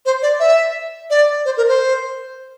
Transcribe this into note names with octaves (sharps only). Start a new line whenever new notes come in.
C5
D5
E5
D5
C5
A#4
C5